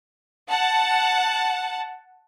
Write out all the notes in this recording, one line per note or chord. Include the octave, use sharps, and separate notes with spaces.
F#5 A5